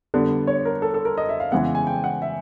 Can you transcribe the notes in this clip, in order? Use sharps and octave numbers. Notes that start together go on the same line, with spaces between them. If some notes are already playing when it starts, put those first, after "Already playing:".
D3 G3 B3 D5
C#5
A#4
A4
A4
A#4
D#5
E5
F5
C#3 E3 G#3 B3 F#5
G#5
G5
F#5
E5